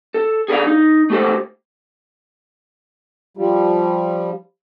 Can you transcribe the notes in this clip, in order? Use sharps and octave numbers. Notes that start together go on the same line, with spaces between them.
A4
G#4 A4 B4 D5 F5
D#4
A3 G4 A4 C5
F3 G3